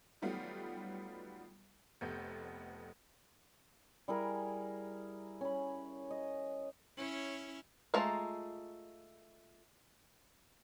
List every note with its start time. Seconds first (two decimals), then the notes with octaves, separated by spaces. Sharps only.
0.22 D#3 F#3 G3 A3 B3 F4
2.01 F1 F2 A3 B3 G6
4.08 G3 E4 G#4 A#4
5.41 C#4 B5
6.10 D#5
6.97 C#4 E4 C#5
7.94 G#3 A3 F4 A5 A#5